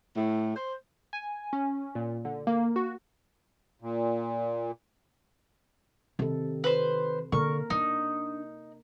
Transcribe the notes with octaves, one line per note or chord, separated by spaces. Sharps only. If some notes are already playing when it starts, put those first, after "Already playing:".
A2
C5
G#5
C#4
A#2
D3
A#3
F#4
A#2
C3 D#3 A4
B4 C5
D3 A#3 A#4 C#6
D4 D#4